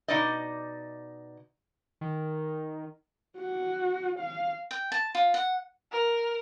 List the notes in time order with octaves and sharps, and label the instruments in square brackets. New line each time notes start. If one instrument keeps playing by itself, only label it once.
[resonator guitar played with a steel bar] B2 D#4 D5 D#5
[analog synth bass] D#3
[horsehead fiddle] F#4
F5
[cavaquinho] G5
A5
F4
F#5
[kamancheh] A#4